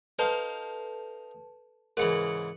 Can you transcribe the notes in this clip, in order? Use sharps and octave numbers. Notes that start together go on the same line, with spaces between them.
D#4 A4 B4 C5 F5 A5
G#2 C#3 E3 A#4 C#7 F#7